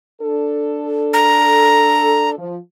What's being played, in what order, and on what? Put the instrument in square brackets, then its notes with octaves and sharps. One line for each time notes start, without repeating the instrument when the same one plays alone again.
[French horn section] D4 A4
[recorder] A#5
[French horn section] F3